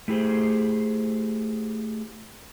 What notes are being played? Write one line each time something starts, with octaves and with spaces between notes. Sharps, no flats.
A3 E4 G4 G#4 C5